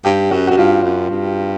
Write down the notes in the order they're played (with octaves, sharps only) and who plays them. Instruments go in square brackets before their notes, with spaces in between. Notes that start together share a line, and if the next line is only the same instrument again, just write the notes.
[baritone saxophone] G2 [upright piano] G4
[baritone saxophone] F#2 [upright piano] F#4
[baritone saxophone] F#2 [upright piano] F#4
[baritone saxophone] G2 [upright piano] F4
[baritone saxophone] F#2
G2